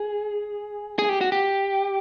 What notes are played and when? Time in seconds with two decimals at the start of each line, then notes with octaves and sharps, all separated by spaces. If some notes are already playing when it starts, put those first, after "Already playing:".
Already playing: G#4
0.99 G#4
1.09 G4
1.21 F#4
1.32 G4